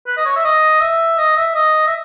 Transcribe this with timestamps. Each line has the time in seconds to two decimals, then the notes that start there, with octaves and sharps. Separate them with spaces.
0.07 B4
0.17 D#5
0.25 C#5
0.36 E5
0.44 D#5
0.80 E5
1.18 D#5
1.36 E5
1.54 D#5
1.87 E5